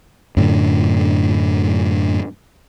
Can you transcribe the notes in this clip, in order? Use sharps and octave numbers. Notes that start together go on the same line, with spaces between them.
F#2 A2 D3